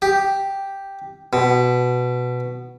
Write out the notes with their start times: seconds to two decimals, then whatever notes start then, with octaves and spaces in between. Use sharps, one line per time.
0.02 G4
1.33 B2